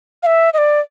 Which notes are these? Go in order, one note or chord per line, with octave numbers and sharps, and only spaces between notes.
F5
E5
D#5
D5